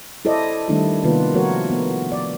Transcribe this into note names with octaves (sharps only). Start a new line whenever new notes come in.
E4 A4 C5 D5 D#5
D#3 G3 A3 D4 E4 A4
C3 D#3 A#3 B3 F4 B4
F3 A3 F#4 A#4 C#5
B3
D5